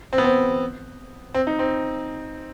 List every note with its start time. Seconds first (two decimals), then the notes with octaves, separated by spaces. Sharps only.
0.13 C4
0.18 B3
0.24 C4
1.34 C4
1.47 D#4
1.59 C4